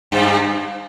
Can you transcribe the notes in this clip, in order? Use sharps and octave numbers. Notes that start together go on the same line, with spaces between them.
G2